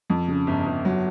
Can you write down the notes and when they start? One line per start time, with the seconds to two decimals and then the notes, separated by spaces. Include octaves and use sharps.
0.10 F2
0.28 C#3
0.47 G1
0.67 G1
0.85 F#3